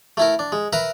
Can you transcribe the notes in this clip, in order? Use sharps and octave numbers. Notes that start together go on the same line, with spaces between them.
A3 E4 A#4
D4
G#3
A#4 B4 E5 A#5